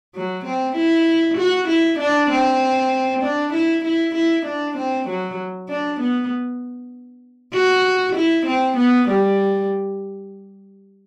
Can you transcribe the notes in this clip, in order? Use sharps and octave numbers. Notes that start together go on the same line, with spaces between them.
F#3
C4
E4
F#4
E4
D4
C4
D4
E4
E4
E4
D4
C4
F#3
D4
B3
F#4
E4
C4
B3
G3